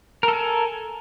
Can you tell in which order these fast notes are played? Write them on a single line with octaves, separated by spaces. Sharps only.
A#4 A4 G#5